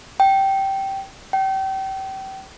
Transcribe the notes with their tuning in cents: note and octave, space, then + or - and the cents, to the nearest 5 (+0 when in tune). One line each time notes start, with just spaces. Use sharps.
G5 -10
G5 -30